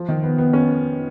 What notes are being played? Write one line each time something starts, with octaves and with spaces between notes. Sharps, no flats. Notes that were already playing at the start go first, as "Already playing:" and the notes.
Already playing: F3
D#3
B3
B3
C#4